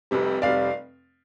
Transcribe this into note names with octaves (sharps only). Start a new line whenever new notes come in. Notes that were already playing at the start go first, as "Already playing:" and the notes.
F1 F2 C3 G3
F1 C3 G3 D5 F5